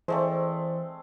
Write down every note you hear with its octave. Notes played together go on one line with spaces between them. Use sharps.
E3 G#3 A3 C4 C5 D5